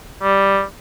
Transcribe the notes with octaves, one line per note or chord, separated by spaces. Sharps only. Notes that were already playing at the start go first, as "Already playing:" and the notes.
G3